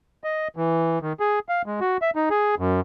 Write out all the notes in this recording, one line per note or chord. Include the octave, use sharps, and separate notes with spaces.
D#5
E3
D#3
G#4
F5
G#3
F#4
E5
D#4
G#4
F#2